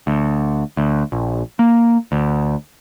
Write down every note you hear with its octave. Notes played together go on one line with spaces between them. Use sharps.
D2
D2
A#1
A#3
D2